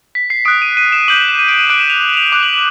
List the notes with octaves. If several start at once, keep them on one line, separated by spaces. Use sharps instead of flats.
B6
C7
D#6 F#6 D7
D#7
D#7
E7
D6 G6 F#7
F#7
E7
D#7
D7
D#7
D6 F#6 D7
E7
F7
F7
F7
D6 F#6 F7
F#7
F#7